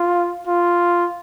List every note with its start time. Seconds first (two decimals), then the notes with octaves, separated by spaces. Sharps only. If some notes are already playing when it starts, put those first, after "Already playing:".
Already playing: F4
0.47 F4